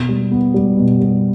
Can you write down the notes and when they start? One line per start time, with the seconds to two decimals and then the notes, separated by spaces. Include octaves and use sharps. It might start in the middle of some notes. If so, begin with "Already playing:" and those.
Already playing: B2
0.08 G3
0.31 B3
0.54 G3
0.77 B2
1.00 G3